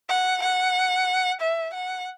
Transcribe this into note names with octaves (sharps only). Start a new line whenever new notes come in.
F#5
F#5
E5
F#5